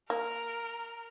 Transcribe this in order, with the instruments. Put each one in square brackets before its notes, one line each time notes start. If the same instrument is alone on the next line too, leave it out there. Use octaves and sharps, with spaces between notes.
[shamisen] A#3 [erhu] A#4